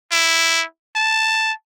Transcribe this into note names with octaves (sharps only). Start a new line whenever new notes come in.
E4
A5